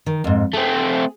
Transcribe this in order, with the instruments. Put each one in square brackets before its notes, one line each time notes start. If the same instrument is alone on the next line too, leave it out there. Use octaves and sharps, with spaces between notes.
[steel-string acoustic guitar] D#3
F2 G#2
[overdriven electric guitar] A3 C4 [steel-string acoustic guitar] G#4